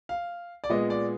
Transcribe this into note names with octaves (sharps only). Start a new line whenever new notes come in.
F5
D5
A#2 G#3 B3 D#5
D5